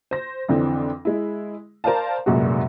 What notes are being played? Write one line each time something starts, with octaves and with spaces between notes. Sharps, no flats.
C5 A#6
F2 D3 E3 C4
G#3 E4
A#4 C5 D5 F5 A5
F1 F#2 A#2 G#3 F#4